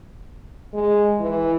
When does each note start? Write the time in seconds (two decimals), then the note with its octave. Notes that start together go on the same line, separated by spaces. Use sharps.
0.74 G#3
1.20 E3